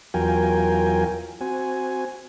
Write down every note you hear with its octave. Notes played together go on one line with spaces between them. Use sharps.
E2 F#3 F4 A#4 G5 G#5
C4 F#4 G#5